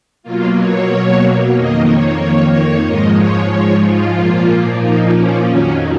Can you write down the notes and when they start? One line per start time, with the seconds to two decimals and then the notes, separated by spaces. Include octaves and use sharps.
0.23 B2 F#3 A#3 F4
0.55 C#5
1.53 F2 D#3 A#3 D#5
1.86 C#5
2.19 C#5
2.51 C#5
2.84 G#2 F3 G#3 D#5
3.17 C#5
3.49 C#5
3.82 F4
4.14 A#2 F3 A#3
4.79 D#4
5.13 C#4
5.45 F2 D#3 F#3 C#4